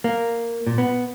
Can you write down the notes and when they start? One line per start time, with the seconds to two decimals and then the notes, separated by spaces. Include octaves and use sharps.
0.04 A#3
0.67 A#2
0.78 B3